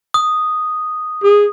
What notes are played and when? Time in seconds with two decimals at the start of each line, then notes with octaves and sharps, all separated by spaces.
0.14 D#6
1.24 G#4